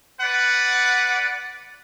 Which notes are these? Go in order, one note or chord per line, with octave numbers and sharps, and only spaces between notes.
B4 D5 F#5